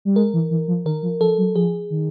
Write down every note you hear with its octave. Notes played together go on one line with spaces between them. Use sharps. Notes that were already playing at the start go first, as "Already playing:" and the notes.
G3
G#3 A#4
E3
E3
F3
D#3 A#4
F3
F3 A4
F#3
F3 G#4
D#3